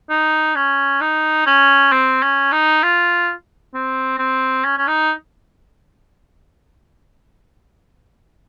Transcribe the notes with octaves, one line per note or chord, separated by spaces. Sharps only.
D#4
C#4
D#4
C#4
C4
C#4
D#4
F4
C4
C4
C#4
C#4
D#4